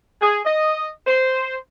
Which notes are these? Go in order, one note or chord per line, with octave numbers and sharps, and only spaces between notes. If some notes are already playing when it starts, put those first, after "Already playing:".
G#4
D#5
C5